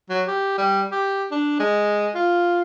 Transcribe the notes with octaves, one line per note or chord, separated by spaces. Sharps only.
F#3
G4
G3
G4
D4
G#3
F4